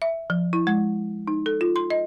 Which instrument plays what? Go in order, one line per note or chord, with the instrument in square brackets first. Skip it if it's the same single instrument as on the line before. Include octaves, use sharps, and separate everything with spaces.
[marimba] E5
F3
E4
G#3
D#4
A4
F4
C6
D#5